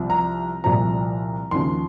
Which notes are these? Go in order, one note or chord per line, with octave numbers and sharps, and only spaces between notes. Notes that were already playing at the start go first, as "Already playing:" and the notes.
Already playing: C2 C3 F3
A#5
C2 A#2 F3 A#5
D#2 C#3 F3 C6